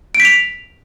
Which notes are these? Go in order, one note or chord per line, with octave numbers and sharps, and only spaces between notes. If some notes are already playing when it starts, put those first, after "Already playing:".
D7
B6
F7